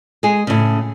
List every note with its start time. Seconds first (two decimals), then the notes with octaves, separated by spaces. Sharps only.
0.23 G#3 G#4
0.47 A2 C#3